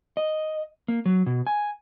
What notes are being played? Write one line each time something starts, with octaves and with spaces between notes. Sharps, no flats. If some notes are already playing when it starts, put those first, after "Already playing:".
D#5
A#3
F#3
B2
G#5